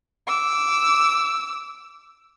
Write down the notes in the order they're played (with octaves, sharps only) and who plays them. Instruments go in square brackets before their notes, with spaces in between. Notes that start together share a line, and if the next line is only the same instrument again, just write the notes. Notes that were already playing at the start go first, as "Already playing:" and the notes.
[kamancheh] D6 E6